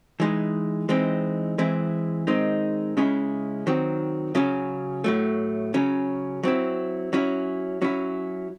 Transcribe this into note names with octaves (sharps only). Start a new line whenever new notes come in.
E3 G#3 D#4
E3 G#3 C4 D#4
E3 G#3 C4 E4
D#3 G#3 C4 D#4
C#3 G#3 C#4 E4
D#3 F#3 C4
C#3 F#3 C#4
A2 F#3 A3
C#3 F#3 C#4
F#3 C4 E4
F#3 C#4 E4
F#3 C#4 E4